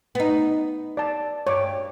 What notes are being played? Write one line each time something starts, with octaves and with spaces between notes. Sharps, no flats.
B3 D#4
D5 A5
G2 C#5 D6